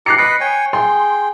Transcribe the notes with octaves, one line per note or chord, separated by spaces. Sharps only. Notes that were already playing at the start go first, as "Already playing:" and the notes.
G4 A#5 F#6 C7 C#7
B4 D#5 B5 C#7
C#5 G5 G#5
G#4 G5 C6